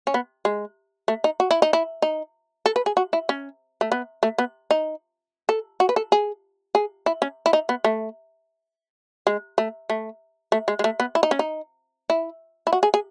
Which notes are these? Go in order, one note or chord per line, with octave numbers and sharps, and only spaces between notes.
C#4
B3
G#3
A3
D#4
F#4
E4
D#4
E4
D#4
A4
B4
G#4
F#4
E4
C#4
A3
B3
A3
B3
D#4
A4
F#4
B4
A4
G#4
G#4
E4
C#4
E4
D#4
B3
A3
G#3
A3
A3
A3
G#3
G#3
A3
B3
E4
D#4
C#4
D#4
E4
E4
F#4
G#4
G#4